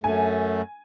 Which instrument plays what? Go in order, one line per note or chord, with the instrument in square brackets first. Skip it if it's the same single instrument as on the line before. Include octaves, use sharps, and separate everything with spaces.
[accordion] F#2 A3 [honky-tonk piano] G#5